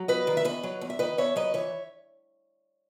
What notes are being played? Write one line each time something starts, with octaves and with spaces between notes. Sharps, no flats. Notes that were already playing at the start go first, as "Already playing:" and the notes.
Already playing: F#3
E2 B4 D#5
D#3
E5
E2 B4 D#5
F#3
E2
E5
D#3 B4 D#5
E2 C#5 E5
F#3 B4 D#5
E3 C#5 E5